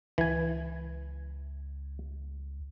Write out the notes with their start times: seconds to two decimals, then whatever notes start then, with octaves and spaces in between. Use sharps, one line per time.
0.18 C#2 E3 G#5